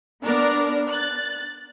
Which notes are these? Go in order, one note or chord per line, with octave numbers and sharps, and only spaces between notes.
B3 D4 A#4 D5
F#6 A6